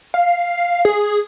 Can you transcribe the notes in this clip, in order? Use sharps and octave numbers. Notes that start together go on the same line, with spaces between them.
F5
G#4